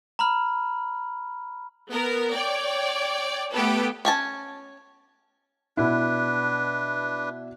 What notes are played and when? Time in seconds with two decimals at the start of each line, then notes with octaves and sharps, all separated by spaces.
0.19 A#5 B5 F6
1.90 B3 A#4
2.34 C#5 D5 G5
3.53 A3 B3 G4 A4 B4
4.05 C#4 G#5 A5
5.77 B2 D4 E4 B4